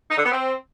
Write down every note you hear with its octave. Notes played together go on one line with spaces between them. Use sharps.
D#4
D3
B3
C4